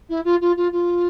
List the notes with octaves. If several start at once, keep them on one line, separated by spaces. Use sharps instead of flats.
E4
F4
F4
F4
F4